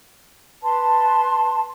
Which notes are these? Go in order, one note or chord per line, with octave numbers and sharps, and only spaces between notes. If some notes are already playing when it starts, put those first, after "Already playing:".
B4 A5 C6